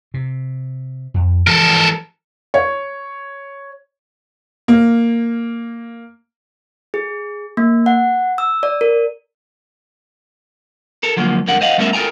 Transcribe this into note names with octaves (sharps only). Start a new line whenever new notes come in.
C3
F2
E3 F3 G#3 A4 A#4
C#5
A#3
G#4
A#3
F#5
E6
D5
A#4
A4 A#4
D3 F3 F#3 G#3 A#3
F2 D3 G3 G#3 A#4 F#5
C5 D#5 F5 F#5
G3 A3 B3 C#4 A#4 E5
A4 A#4 G5 G#5 A#5